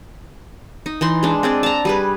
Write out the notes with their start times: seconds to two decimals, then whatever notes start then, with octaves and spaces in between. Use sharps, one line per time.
0.86 D#4
1.01 E3 D#4 C6
1.23 G#3 D4
1.43 C4 G#4 D5
1.63 A5 A#5
1.85 G3 G#4 B4